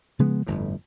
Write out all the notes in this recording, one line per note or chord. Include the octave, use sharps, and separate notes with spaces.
C#3 F3 G#3 B3
G1 F2 A2